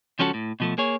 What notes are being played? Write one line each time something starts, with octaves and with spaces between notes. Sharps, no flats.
C#2 F3 C#4 F#4 A4
A2
B2 F3 A3
A#3 G#4 C#5